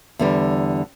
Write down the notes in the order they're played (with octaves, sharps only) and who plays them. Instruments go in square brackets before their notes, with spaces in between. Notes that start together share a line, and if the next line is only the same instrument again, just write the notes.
[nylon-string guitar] E2 D3 G3